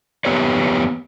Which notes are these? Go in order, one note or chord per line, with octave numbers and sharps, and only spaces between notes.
F2 B3 G4 B4 C#5